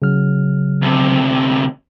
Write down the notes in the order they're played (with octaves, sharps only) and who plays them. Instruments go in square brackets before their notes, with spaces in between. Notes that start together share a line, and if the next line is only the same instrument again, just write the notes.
[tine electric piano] C#3 F#3 F6
[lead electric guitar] D2 C3